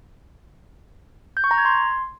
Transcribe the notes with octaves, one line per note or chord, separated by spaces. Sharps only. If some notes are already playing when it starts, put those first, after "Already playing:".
G6
C#6
A#5
G#6
C6